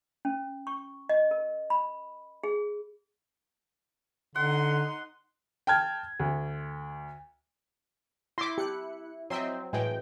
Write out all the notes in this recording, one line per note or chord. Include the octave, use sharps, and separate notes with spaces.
C#4
C#6
D#5
A#4
B5
G#4
D3 D#4 F#5 C6
G5 A5 F6 G#6
D2
E4 C6 D6 A#6 B6
G4 F#6 C#7
F#3 C4 D#5 E5 C6
A2 E3 F#3 G#3 G5